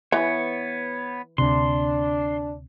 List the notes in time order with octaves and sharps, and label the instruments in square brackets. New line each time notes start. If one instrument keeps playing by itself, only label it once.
[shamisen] E3 [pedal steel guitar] B3 C#5
[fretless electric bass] D2 C3 [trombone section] D4 [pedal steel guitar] C6